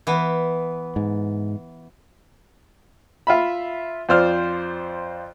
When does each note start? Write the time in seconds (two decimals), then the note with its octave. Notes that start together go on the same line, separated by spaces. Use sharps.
0.07 E3 B3
0.96 G#2
3.27 F4 E5 B5
4.09 F2 F4 C5 D5 F6